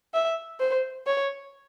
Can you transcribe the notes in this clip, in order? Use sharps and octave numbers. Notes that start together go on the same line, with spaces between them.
E5
C5
C#5